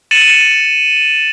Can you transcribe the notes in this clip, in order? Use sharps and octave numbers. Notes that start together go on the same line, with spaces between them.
A6 C#7 D#7 E7 F#7